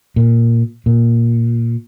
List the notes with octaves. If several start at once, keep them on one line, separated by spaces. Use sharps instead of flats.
A#2
A#2